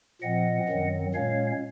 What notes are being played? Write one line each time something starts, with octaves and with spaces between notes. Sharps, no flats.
A#2 F3 C4 D#5 F#5
F#2 D#3 F#3 C4
A#2 G#3 C#4 C#5 F5